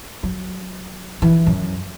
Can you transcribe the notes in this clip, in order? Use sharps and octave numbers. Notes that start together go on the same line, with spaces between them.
F#3
E3
F#2